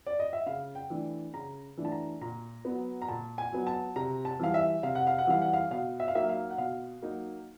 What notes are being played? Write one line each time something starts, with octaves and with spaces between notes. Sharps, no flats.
D5
D#5
E5
C#3 F5
G5
E3 A3 D4
C#3 A#5
E3 A3 D4
A5
A#5
A#2 A#5
F#3 B3
A#5
A#2 A5
G#5
F#3 B3
A5
C3 A#5
A5
E3 G3 F5
E5
C3 F5
F#5
F5
F#5
E3 G3 F5
F#5
F5
B2 F5
E5
F5
F#3 A#3 D#4 E5
F5
F#5
B2 F5
F#3 A#3 D#4